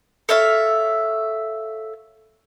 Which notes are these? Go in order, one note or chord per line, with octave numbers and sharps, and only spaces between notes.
A4 C#5 E5 F5